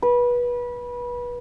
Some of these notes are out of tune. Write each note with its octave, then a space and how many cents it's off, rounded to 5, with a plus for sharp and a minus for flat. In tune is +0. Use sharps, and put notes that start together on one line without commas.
B4 -25